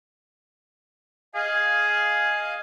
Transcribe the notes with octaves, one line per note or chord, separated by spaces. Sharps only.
G#4 D#5 F5 G#5